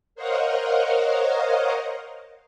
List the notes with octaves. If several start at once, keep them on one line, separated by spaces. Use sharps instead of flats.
A#4 C5 C#5 D#5 F5 F#5